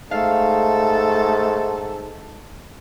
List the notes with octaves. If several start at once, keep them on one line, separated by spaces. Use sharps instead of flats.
G#2 A3 A4 F5